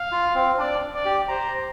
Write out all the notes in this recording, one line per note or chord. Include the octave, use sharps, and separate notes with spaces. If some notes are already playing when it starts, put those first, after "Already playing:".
Already playing: F5
F4
C4
D4 D5
D5
G4
C5 A#5